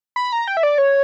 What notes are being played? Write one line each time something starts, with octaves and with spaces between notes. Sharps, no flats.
B5
A#5
G5
E5
D5
C#5